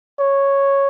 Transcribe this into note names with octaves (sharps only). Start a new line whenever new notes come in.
C#5